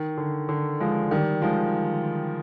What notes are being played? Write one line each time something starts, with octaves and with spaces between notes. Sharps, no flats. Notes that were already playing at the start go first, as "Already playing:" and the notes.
Already playing: D#3
D3
D3
F3 G#3
D#3 G3
F3 G#3